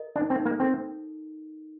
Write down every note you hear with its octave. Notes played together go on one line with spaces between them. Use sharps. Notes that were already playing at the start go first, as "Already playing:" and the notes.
Already playing: A#4 D#5
D4 D#4
C4
D#4
A#3
C4 A4